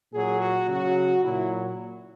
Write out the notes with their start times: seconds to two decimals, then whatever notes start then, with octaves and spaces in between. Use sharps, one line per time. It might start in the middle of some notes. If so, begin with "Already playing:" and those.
0.12 A#2 F#3 G#4
0.39 F#4
0.68 C#3 F#3 F#4
1.23 A#2 F#3 E4